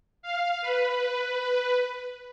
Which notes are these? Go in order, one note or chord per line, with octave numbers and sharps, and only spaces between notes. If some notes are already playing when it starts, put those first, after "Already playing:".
F5
B4